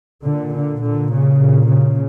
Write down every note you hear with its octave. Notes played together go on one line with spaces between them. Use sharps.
A#2 D3
D3
A#2 D3
C#3
A#2
C#3